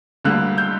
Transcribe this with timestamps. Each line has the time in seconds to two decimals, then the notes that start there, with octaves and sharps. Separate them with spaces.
0.25 D2 D3 G3 A#3 F#6
0.58 G6